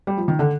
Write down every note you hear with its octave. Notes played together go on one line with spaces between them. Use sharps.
G3
F3
D#3
D3